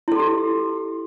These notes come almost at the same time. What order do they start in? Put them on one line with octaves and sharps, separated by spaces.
E4 A4 F#4 G4